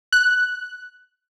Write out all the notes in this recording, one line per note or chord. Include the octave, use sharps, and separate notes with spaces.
F#6